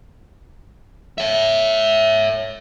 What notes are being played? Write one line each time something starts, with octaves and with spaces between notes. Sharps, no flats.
C#5 E5